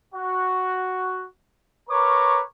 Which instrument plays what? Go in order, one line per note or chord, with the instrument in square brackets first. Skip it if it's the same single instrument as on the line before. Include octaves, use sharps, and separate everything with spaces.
[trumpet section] F#4
A#4 B4 C#5 A#5 C#6 D6